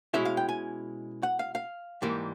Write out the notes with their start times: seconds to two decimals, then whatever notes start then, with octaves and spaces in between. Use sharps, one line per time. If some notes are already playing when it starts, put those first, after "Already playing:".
0.14 B2 G#3 C#4 E4 E5
0.25 F5
0.37 G5
0.49 G#5
1.23 F#5
1.39 F5
1.55 F5
2.02 G#2 E3 G3 A#3